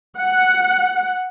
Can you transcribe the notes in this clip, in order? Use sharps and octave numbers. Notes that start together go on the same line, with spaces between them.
F#5